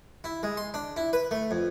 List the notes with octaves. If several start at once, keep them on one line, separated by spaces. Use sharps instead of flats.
E4
G#3
C6
D4
E4
B4
A3
F2